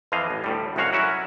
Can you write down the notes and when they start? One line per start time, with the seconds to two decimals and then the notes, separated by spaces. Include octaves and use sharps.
0.12 F2 E3 F3 D#5 F5
0.30 A1
0.44 D2 A2 G3
0.76 C2 F#2 G#3 F#4 C#5 F5
0.93 F#3 C#4 E4 F#4 E5